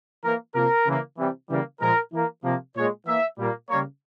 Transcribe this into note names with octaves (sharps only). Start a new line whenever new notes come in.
E3 A#3 A#4
C3 F3 A#3 A#4
C#3 E3 A#3
C3 E3 G3
C#3 E3 G3 A#3
A#2 F3 G#3 A#4
E3 A#3
C3 F3 A#3
A#2 G#3 C#5
E3 A#3 E5
A#2 G3 A#3
C#3 G3 A#3 C#5